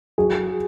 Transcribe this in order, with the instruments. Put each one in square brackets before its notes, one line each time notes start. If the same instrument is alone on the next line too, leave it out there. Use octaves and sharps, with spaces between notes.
[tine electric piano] F#3 F#4 [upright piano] G#4